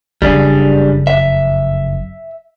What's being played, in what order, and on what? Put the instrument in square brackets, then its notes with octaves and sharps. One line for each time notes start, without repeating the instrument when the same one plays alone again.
[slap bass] F#1 F2 C#3 [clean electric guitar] G3 D4 G#4
[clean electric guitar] E5